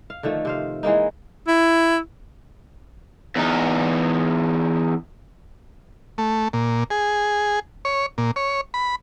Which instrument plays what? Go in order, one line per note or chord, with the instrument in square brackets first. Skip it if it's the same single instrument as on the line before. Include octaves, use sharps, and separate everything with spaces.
[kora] F5
D3 D#3 F3 A3
C3 C5 F5
E3 G#3 A#3 D#4
[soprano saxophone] E4
[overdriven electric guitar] E2 D#4
[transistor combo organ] A3
A#2
G#4
C#5
A#2
C#5
B5